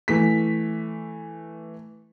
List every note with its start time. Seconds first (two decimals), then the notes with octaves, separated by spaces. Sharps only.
0.08 E3 A3 B6